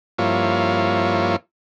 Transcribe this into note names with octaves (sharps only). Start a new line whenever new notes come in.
G2 F3 A#3 E4 F4 C#5